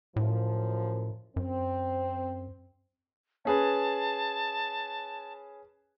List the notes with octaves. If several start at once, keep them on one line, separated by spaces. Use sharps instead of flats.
F#2 A2 F3
F#2 C4
C#4 G#4 B4 A5